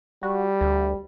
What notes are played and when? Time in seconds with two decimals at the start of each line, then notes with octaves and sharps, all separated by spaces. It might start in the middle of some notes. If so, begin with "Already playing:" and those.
0.23 G3 F#4
0.61 D2